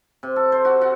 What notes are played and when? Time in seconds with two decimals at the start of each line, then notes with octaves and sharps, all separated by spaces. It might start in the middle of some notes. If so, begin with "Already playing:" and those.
0.23 C3
0.36 A4
0.52 C5
0.65 F#4
0.81 F#4